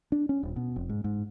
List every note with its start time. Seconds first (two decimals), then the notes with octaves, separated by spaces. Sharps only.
0.12 D4
0.29 C#4
0.43 D#1
0.56 B2
0.76 F1
0.89 G#2
1.04 G#2